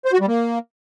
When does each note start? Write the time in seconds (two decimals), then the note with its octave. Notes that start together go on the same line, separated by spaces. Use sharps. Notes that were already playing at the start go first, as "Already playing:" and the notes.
0.05 C5
0.13 F#4
0.20 G3
0.28 A#3